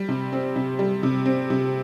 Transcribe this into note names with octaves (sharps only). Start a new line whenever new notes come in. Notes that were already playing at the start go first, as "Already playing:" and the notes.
Already playing: G3
C3
C4
C3
G3
C3
C4
C3